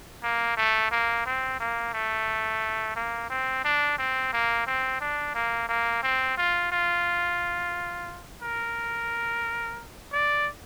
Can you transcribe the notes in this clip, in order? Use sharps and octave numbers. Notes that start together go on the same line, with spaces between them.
A#3
A3
A#3
C4
A#3
A3
A#3
C4
D4
C4
A#3
C4
D4
A#3
A#3
C4
F4
F4
A#4
D5